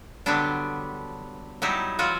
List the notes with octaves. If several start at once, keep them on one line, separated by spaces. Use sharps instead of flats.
D3 F#3 G3 B3 D4
F#3 G3 D#4 E4
E3 F#3 F4 F#4